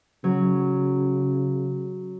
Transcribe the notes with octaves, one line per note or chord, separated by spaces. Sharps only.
C#3 F#3